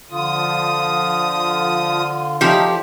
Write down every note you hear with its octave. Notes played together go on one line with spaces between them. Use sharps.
D3 F3 F4 D#6
F3 A3 C#4 D#4 G4